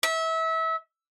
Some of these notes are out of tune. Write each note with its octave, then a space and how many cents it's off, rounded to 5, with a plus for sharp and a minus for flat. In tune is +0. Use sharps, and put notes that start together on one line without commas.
E5 -25